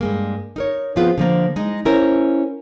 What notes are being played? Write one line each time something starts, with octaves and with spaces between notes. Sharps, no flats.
G2 G#3 A#3
D#4 A#4 C#5
F3 B3 C4 F4 G#4 B4
D3 F3 A#3
G#3 D#4
C#4 E4 A#4 C5 C#5